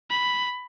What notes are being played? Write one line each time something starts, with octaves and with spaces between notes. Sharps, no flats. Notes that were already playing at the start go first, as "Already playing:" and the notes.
B5